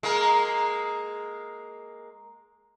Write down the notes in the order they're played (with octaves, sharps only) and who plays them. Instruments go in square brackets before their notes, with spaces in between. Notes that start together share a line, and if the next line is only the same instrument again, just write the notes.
[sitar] G#3 A#3 A#4